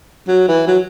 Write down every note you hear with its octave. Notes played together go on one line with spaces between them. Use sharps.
F#3
E3
F#3